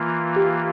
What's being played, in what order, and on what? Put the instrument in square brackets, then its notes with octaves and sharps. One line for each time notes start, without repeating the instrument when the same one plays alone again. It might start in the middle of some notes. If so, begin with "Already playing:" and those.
Already playing: [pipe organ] E3 A#3 F4
[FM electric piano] G4